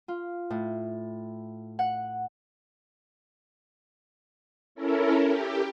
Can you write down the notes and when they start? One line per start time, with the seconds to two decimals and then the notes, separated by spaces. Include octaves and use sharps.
0.08 F4
0.50 A2
1.79 F#5
4.75 C#4 E4 A4 A#4
5.26 G4